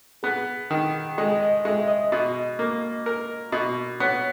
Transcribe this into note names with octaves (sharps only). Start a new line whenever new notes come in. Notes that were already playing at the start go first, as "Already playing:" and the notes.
B3 G#4
D#3
G#3 D#5
D#5
G#3 E5
D#5
B2
A#3
A#4
B2
B3 C#5